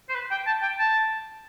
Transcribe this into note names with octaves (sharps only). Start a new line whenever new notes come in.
C5
B4
G5
A5
G5
A5